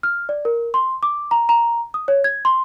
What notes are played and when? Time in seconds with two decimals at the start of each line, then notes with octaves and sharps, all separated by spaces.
0.03 F6
0.29 D5
0.45 A#4
0.74 C6
1.03 D6
1.31 A#5
1.49 A#5
1.94 D#6
2.08 C#5
2.24 G#6
2.45 C6